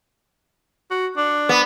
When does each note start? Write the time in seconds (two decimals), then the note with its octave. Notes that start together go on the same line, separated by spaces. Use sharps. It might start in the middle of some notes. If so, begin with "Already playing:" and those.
0.90 F#4
1.17 D4
1.49 B3